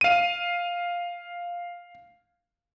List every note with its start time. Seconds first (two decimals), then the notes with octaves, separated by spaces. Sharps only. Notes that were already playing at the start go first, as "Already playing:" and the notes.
0.01 F5 D#7